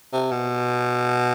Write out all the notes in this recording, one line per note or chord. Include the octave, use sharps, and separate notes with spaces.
C3
B2